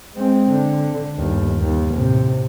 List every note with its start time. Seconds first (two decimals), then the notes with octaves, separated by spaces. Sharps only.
0.15 G#3 C4
0.49 D3
1.17 G1 D#2
1.60 D#2
1.94 A2 C3